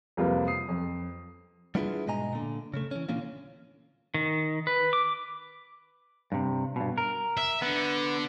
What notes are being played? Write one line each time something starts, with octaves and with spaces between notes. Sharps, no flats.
C2 F2 C3 A#3 F4 B4
D#6 C7
F2
G3 B3 D4 E4 F4 G#4
G#2 B2 G#3 D#5 G#5 A#5
A#2 D3
C#3 A3
E3 C#4
A#2 D3 E3 A#3 C#4 F4
D#3
B4
D6
G2 C3
G2 B2
A#4
E5
D3 B3